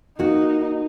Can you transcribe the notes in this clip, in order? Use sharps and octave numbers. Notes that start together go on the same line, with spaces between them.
A#3 D#4 F#4